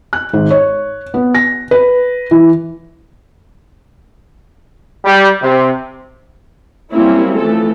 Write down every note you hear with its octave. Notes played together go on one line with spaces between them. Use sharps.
F#6
G#1
C#5
B3
A#6
B4
E3
G3
C3
F#3 G3 A#3 C4 C#4 E4
E3 F3 A3 A4